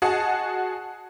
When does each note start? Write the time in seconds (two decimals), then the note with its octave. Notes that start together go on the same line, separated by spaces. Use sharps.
0.02 F#4 G#4 D#5 F#5 A5